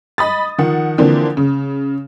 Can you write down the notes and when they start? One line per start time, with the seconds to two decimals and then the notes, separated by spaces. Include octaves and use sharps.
0.18 D#5 B5 D#6 A6
0.58 D#3 F3 F#5
0.98 D3 E3 F3 A#3 C4 D4
1.37 C#3